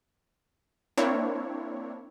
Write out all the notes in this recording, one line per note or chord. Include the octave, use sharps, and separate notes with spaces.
A#3 C4 D4 E4 C#5